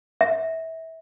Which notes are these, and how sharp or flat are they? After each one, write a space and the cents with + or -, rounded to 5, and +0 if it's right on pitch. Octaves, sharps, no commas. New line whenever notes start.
E5 -25